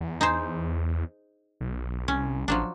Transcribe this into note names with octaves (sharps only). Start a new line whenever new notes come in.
E2
D#4 G#4 C5
B1
C2 C#4
A1 F3 F#3 D4